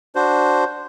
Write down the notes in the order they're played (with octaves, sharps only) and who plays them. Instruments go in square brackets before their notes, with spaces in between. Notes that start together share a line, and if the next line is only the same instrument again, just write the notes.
[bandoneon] D4 F#4 C5